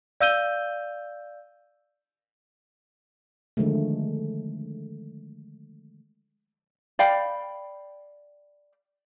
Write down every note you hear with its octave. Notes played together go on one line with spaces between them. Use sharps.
D5 F5 E6 G6 D#7 G7
D3 D#3 F3 G#3 A3
D5 F5 G5 B5